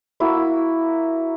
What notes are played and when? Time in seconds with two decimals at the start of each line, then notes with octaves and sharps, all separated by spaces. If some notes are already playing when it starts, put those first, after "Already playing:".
0.20 A#3 E4 F#4